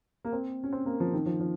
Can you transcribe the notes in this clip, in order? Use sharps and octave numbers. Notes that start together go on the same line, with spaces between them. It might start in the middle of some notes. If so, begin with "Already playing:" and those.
A#3
C4
C#4
C4
A#3
F3
D#3
F3
F3